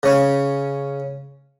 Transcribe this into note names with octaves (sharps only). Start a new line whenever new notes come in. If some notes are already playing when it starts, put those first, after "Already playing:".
C#3 C#4